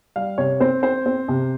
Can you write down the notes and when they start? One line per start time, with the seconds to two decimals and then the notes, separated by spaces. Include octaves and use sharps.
0.16 G3 F5
0.38 C3 C#5
0.60 C4 C5
0.83 C4 C5
1.06 C4
1.28 C3